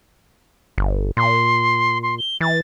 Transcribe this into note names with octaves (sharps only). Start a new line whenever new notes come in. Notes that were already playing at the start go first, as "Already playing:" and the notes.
G1
A#2 C6
C6
G7
E3 A6